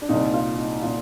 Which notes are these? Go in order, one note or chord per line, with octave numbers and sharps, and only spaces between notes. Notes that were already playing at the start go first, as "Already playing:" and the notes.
D4
C2 A#2 D#4
F4
D#4
A#2 F4